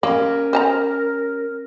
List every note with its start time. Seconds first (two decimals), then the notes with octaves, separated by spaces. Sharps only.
0.03 A#3 C#4 G4 A#4
0.53 C5 A5 A#5